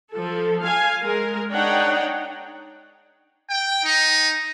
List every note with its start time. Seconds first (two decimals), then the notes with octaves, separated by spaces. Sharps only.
0.12 F3 A4
0.65 F5 G#5
1.03 G#3 A#4
1.52 D4 D#4 C#5 F#5 G5
3.49 G5
3.84 D#4